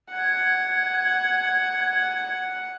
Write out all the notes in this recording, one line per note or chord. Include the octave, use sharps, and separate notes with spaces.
F#5 G#6